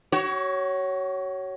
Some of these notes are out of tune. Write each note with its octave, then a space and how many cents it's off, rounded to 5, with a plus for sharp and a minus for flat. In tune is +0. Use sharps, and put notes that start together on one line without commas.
F#4 +35 C#5 +0